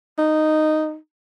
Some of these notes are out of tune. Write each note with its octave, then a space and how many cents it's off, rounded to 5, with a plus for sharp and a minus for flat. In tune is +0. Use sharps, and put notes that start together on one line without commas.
D#4 -5